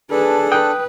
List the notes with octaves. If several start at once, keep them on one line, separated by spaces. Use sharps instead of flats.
D4 G#4 A4 B4
B4 G5 D#6 F#6